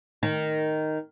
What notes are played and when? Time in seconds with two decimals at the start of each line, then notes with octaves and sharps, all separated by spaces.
0.23 D#3